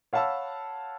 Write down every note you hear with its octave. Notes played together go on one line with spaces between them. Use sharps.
C#5 F5 F#5 A5 B5 E6